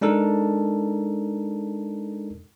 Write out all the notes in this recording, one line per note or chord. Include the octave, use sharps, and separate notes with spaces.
G#3 D4 D#4 A4 A#4